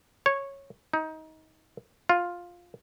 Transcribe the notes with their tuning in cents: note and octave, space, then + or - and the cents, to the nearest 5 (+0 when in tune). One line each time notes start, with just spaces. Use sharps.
C#5 -10
D#4 +20
F4 +10